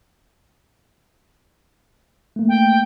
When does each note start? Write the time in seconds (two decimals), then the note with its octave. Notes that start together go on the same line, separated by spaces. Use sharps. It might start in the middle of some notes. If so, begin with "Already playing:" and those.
2.36 A3 A#3
2.49 G5